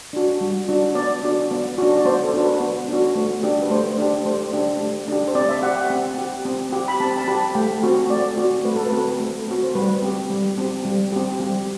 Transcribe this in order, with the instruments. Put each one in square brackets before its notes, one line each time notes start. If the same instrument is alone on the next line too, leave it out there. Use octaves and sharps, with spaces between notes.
[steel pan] D4 F#4
G3
D4 F#4
B3 D5
D4 F#4
B3
D4 F#4
D5
B3 C5
A4
D4 F#4
B4
B3
D4 F#4
A3
D4 G4
B4
A3 C5
D4 G4
A3 C5
D4 G4
A3
D4 G4
C5
C4 D5
D5
E5
G4 F#5
G5
C4
G4
C4
G4
B5
C4 A5
A5
G4 B5
A3 G5
C4 F#4
A3 D5
C4 F#4
A3 B4
A4
B4
C4 F#4
A3
C4 F#4
C5
G3 B4
C4 G4
G3
C4 G4
G3
C4 G4
G3 G4